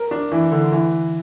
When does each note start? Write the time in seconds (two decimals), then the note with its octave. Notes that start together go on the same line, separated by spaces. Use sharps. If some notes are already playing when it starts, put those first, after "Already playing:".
Already playing: A#4
0.11 D4
0.32 E3
0.52 D3
0.72 E3